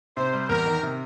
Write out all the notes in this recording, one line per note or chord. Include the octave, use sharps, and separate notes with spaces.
C3 C5
G3
E2 A#4
D#3
C3